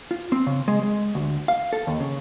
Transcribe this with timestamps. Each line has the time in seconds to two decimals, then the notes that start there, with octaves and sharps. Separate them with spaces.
0.11 F4
0.32 C4
0.47 C#3
0.68 G#3
0.83 G#3
1.15 D2
1.48 F5
1.73 A4
1.87 D#2
2.00 C#3